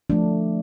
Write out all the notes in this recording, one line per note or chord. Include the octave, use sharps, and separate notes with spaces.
F3 A3 D4